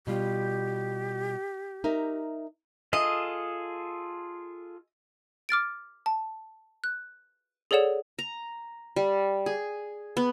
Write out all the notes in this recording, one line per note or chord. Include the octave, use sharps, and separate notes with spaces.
B2 G3 F4 G4
D#4 A#4 E5
F4 G#4 A4 D#5
D6 F6 A6 D7
A5
F#6
G#4 A4 C#5 D5 F#5 E7
A#5
G3
G#4
B3